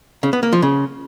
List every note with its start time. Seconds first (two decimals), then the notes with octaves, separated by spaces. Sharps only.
0.23 C#3
0.33 B3
0.43 A#3
0.53 F3
0.62 C#3